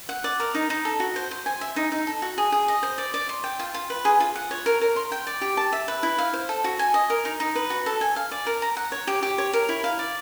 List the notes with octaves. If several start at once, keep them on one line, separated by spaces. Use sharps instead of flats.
F#5
D5
A#4
D#4
D#4
A4
F#4
C5
C5
G#5
E5
D#4
D#4
A4
F#4
G#4
G#4
D#5
C5
D5
D5
C6
G5
F4
F4
B4
G#4
F4
F#5
C#5
A#4
A#4
C6
G5
D5
G4
A5
E5
B4
E4
F5
C5
A4
F#4
G#5
D#5
A#4
D#4
D#4
B4
F#4
A4
G#5
F5
D5
A#4
A#5
F#5
C#5
G4
G4
C#5
A#4
E4
F5
D5